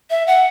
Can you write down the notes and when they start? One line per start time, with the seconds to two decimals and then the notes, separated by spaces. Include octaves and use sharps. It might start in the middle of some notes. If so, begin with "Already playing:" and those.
0.10 E5
0.27 F#5